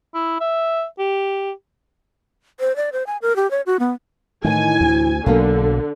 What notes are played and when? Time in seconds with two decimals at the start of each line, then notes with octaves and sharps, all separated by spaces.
0.15 E4
0.40 E5
0.99 G4
2.60 C5
2.76 D5
2.93 C5
3.07 G#5
3.22 A#4
3.36 G4
3.51 C#5
3.66 F#4
3.79 B3
4.44 A2 D#3 E3 G#5
4.81 D2
5.26 B1 D3 F#3 A#3 B3 F5